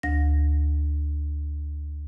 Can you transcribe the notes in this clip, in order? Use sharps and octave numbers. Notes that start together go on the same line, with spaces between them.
D2 A#6